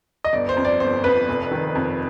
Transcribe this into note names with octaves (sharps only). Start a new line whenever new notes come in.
D#5
G1 D5
C5
F2
D5
G1 C5
F2 B4
F1
D#3
F2